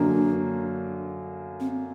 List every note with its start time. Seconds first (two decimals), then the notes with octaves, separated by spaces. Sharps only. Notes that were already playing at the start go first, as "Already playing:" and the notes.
Already playing: F#2 D3 F#3 A#3 D4
1.60 C4